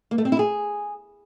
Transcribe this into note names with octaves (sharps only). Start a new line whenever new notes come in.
A#3
A3
C4
E4
G#4